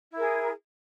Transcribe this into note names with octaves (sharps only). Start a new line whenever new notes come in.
E4 G#4 A#4